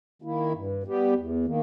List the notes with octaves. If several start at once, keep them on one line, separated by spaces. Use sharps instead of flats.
D#3 A#3 E4
G2
G3 B3 G4
E2
D#3 A#3